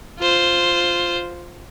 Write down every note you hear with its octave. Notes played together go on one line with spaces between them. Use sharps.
F4 C5